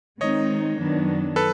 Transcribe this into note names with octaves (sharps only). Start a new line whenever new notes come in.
D#3 G#3 C4 D#4 C#5 D#5
F#2 D#3 F#3 B3 D4
A4 B4